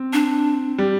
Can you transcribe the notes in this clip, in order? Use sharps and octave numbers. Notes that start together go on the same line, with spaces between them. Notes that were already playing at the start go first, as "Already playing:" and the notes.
Already playing: C4
D4
G3